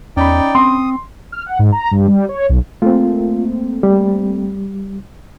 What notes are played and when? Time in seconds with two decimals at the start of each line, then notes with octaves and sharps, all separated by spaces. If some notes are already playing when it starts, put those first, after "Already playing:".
0.17 E2 C#4 D#4 D5 G5 B5
0.55 C4 C6 D#6
1.32 F6
1.46 F#5
1.59 G#2
1.72 A#5
1.91 G2
2.08 G3
2.29 C#5
2.49 B1
2.82 A3 A#3 C4 F4
3.83 G3